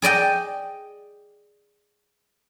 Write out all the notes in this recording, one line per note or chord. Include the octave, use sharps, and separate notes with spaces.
G#4 D5 D#5 G5